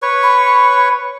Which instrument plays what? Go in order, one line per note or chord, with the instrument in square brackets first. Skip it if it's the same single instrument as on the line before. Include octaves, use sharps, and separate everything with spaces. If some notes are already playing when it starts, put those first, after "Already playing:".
[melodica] B4 C#5 C#6
[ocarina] B5